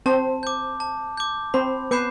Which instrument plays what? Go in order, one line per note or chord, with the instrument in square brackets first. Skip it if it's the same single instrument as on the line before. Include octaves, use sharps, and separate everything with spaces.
[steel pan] C4 C5 [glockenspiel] A5
[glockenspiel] D6 G6
A5
D6 G6
[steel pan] C4 C5 [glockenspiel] B5
[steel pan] B3 B4 [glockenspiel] D6 G6 C7 E7